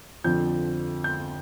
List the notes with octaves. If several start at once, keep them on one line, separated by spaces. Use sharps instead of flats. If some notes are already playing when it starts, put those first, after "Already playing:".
F2 D3 F3 G6
G6